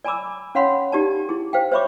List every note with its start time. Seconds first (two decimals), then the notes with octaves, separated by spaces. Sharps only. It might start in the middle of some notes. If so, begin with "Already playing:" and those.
0.05 D5 G#5 A#5 B5 D6 E6
0.55 C#4 C#5 F5 F#5 B5 C6
0.92 D#4 G4 D5 A5
1.29 E4 G#4
1.53 C5 F5 G5
1.72 C5 C#5 E5 B5 C#6 D6